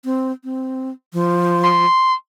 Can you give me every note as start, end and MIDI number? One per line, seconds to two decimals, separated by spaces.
0.05 0.32 60
0.44 0.91 60
1.13 1.85 53
1.64 2.14 84